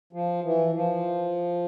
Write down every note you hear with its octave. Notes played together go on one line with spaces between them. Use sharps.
F3
E3
F3